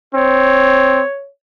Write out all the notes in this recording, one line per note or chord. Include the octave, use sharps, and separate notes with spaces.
C4 C#5